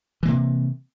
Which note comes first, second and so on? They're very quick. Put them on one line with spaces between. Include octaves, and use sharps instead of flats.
E3 A#3 C3